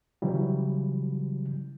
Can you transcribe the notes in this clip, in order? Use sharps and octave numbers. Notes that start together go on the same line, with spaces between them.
C#3 E3 F#3 G3